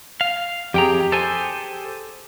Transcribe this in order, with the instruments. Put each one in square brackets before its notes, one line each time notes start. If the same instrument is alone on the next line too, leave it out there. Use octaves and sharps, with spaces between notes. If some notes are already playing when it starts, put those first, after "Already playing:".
[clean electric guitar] F5
[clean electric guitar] F2 G5 A#5 [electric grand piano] G4 G#4
[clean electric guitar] A4 C5 G#5